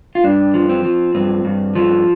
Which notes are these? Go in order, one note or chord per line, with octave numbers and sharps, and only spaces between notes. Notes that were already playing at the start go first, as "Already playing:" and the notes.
F4
G2 D4
F3
C4
F3
G2 C4
G2
F3